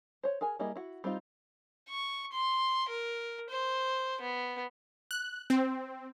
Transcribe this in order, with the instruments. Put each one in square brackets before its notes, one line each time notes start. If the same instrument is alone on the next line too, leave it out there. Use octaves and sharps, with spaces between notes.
[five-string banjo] C5 C#5
G#4 A#4 G#5
G3 A#3 E4 G#4 D#5
E4 F#4
G3 C4 D#4 F4
[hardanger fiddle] C#6
C6
A#4
C5
B3
[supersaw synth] F#6
C4